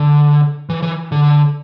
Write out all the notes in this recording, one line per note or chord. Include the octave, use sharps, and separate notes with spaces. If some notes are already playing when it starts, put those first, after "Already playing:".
Already playing: D3
E3
E3
D3